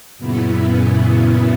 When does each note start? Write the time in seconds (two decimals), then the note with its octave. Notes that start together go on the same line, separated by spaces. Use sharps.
0.18 F#2 A#2 C#3 B3 E4